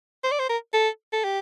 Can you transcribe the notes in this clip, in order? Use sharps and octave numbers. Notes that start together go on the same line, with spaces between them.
C5
D5
C5
A#4
A4
A4
G4